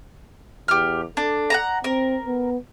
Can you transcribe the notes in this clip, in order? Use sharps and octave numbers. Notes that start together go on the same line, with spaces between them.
E2 G4 F6
D4 A4
F#5 A5 A#5
C4 A#4
B3